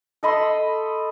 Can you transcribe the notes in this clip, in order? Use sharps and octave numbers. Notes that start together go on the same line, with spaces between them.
A4 D#5 B5 C6